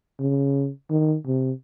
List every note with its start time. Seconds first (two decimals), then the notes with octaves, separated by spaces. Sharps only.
0.20 C#3
0.90 D#3
1.27 C3